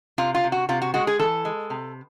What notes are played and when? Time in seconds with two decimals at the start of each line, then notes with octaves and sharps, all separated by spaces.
0.18 C3 F4
0.34 F4
0.44 C3
0.52 F#4
0.69 C3 F4
0.82 F#4
0.94 G#3 F#4
1.07 G#4
1.19 E3 A4
1.45 G#3
1.70 C3